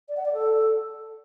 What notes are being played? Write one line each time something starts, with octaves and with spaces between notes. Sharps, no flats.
D5
F#5
D5
A4